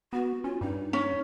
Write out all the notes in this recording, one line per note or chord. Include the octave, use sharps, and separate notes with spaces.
B3 F#4
C#4 F4
G2 D#4
C#4